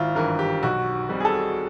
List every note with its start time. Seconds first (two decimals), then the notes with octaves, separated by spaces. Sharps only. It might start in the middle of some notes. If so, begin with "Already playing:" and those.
Already playing: G#1 E4 F4
0.15 G2 E3 A#4
0.39 G4
0.63 B1 F#4
1.09 B2 G3 C4
1.20 G#4
1.25 A4